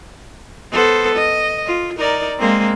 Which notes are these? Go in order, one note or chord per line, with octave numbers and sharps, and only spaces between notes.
B3 A4 C5
D#5
F4
D#4 A#4 D5
G#3 A#3 C4